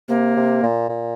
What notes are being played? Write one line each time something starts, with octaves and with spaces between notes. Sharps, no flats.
C3 A#3
C3
A#2
A#2